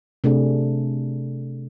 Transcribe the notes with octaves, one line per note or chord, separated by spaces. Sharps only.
C3 A3 D4 G#4